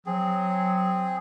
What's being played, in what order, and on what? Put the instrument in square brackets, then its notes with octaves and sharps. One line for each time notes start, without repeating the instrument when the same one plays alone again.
[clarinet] F#3 [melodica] C4 G#4